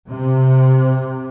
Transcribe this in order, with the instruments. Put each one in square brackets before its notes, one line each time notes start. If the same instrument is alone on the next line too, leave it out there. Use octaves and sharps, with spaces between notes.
[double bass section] C3